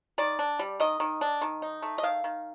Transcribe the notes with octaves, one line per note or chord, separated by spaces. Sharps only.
D#3 D5
D4
G3
D#3 D#5
D#3
D4
D#3
D#4
A3
D#5
D#3 F5
D#3